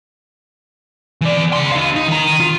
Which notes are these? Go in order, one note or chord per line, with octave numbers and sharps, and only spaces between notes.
E3 D5
C#3 C6
D#4 F5
D#4
D#3 A#5
F4